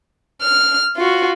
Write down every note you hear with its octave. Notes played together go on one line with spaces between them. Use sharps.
F6
F4 F#4